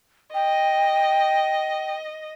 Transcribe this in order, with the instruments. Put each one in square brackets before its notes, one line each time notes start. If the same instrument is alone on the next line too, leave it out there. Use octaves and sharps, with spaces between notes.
[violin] D#5 [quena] G5